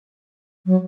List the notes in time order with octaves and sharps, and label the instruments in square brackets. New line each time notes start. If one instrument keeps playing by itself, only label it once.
[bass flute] F#3